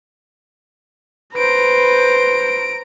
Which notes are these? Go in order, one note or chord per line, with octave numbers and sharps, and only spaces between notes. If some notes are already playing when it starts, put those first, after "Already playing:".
B4 C5 A#5 D7